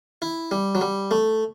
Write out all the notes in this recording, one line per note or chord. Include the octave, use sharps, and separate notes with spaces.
E4
G3
F#3
G3
A3